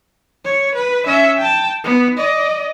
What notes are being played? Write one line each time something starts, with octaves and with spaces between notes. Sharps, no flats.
C#5
B4
C#4 E5
G5 A5
B3
D5 D#5